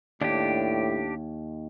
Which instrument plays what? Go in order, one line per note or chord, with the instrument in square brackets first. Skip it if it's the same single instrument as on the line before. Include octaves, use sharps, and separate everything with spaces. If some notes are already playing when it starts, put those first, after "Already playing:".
[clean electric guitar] D#2 [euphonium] A2 [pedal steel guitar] D4 G4